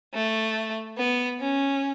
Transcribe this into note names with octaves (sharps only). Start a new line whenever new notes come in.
A3
B3
C#4